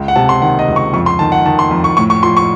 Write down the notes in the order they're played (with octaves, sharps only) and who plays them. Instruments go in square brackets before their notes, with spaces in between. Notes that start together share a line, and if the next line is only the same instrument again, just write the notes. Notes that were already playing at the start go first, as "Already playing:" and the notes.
Already playing: [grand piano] C#2
F#5
C3 A5
C6
D#3 F#5
D#5
C#2
C#6
F2 C#6
C6
D#3 A5
F#5
D#3 A5
C6
F2
C#6
A2 C#6
C#6
F3 C6
C#6